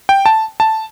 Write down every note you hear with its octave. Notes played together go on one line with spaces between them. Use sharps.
G5
A5
A5